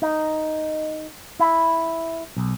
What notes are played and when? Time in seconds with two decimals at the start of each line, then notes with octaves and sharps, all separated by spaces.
0.02 D#4
1.40 E4
2.37 B1